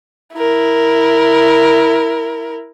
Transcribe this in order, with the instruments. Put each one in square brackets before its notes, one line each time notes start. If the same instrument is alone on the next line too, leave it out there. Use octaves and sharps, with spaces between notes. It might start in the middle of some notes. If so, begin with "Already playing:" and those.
[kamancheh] E4 A#4